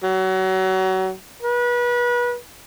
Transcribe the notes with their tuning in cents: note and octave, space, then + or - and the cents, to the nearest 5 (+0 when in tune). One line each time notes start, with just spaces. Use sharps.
F#3 +30
B4 -30